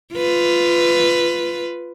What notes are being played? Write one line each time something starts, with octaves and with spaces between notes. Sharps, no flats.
F4 B4